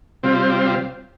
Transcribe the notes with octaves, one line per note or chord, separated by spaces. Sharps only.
C3 G3 C4 F4